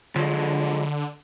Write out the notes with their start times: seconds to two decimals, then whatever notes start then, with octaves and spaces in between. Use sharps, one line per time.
0.16 D3 F3 F#3 G#3